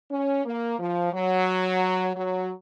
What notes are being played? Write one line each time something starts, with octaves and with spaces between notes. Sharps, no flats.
C#4
A#3
F3
F#3
F#3